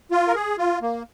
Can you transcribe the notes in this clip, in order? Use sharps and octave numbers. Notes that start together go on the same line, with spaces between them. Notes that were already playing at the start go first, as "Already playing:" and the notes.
F4
A#4
G#4
F4
A#3